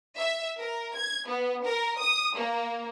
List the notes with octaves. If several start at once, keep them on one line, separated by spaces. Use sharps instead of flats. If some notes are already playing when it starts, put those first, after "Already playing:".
E5
A#4
G#6
B3
A#4
D#6
A#3